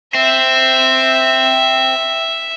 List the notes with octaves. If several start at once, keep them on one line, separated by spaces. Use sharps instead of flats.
C4 E5